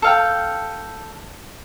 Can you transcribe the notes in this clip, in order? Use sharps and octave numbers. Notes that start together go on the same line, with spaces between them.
A4 F5 G5